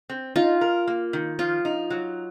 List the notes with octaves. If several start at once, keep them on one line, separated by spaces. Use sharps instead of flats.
C4
D#4 F4
A#4
A#3
D#3
F3 F4
D#4
F#3